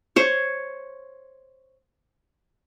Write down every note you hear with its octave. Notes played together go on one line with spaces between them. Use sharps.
C5 C#5